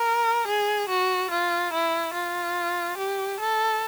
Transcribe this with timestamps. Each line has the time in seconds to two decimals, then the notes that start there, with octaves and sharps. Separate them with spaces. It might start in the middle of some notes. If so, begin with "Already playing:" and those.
Already playing: A#4
0.47 G#4
0.89 F#4
1.30 F4
1.73 E4
2.13 F4
2.97 G4
3.40 A4